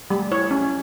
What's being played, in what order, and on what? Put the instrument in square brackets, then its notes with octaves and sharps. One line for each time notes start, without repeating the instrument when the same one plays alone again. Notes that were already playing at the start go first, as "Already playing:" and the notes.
[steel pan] G3 [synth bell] A3
[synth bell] E4 [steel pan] C#5
[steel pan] C#4